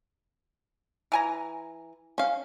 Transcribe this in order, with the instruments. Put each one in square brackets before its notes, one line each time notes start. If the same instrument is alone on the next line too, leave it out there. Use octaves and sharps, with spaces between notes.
[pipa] E3 G#5 A#5
[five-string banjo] C#4 F5